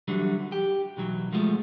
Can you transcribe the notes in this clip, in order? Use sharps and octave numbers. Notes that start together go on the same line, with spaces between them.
D3 E3 F#3 G3
G4
B1 E3 F#3
F3 G#3 A3 F4